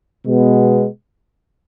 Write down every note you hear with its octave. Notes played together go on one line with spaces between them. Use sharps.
B2 G#3 B3